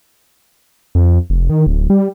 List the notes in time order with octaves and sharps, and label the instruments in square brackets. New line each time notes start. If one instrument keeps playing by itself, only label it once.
[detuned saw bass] F2
F1
D#3
D1
G3